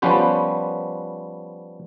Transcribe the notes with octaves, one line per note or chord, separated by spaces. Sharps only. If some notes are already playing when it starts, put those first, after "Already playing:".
F3 G3 B3 C#4 B4 C5